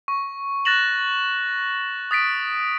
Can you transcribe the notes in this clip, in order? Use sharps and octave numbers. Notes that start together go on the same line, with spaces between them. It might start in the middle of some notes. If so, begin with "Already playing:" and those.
C#6
F#6 A6 A#6 E7 F#7
D#6 A6 B6 D7